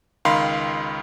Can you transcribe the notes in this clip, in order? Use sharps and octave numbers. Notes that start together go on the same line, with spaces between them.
C#2 D#3 F5 B5 C6